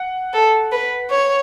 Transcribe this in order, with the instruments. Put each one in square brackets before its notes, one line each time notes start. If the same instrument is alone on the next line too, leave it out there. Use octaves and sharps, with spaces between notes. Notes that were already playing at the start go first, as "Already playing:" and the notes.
Already playing: [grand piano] F#5
[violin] A4
B4
C#5